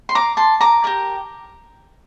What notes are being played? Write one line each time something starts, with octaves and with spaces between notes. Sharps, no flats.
C6
A#5 D6
A5 C6
A#5 D6
G4 A#4 D5